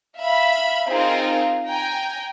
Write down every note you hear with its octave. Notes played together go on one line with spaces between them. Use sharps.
E5 F5 B5
C4 D#4 F4 G#4 A#4
G5 G#5 A#5